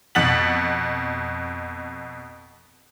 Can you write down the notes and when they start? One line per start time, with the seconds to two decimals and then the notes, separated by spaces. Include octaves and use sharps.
0.15 F2 B2 F#5 A6 B6 F#7